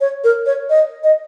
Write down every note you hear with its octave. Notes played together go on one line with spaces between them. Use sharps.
C#5
A#4
C#5
D#5
D#5